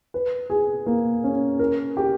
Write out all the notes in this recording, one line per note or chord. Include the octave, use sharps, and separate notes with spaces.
B4
G#4
A#3
C#4
A#4
G4